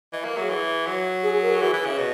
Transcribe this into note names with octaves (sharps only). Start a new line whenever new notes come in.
E3 D#5
A#3 E5
F#3 G#4
E3
F#3
G#4
A#4
G#4
F#4
E3
G#4
E3
C#3
B2